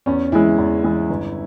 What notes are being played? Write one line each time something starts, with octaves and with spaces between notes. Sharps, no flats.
E2 C#4
E3 G#3 E4
E2
E3 G#3
G1